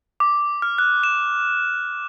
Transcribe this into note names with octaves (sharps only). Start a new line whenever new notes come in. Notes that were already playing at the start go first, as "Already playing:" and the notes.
D6
F6
F#6
E7